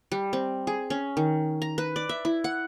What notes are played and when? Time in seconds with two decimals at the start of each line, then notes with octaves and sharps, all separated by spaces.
0.12 G3
0.33 C4
0.67 G#4
0.90 C#4
1.17 D#3
1.62 A#5
1.78 B4
1.96 D5
2.09 E5
2.25 E4
2.44 F#5